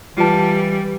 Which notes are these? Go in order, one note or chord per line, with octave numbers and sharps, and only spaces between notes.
E3 G3 F4 A5